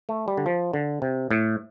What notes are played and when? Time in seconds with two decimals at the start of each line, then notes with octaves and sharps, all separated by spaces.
0.09 A3
0.28 G3
0.37 D3
0.46 F3
0.73 D3
1.02 C3
1.31 A2